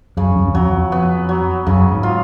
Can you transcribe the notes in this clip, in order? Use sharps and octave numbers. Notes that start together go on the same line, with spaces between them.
F#2 C#3
F#2
F#2
F2 F#3
F2
B3
F#3
F#2 C#3
G#2
F4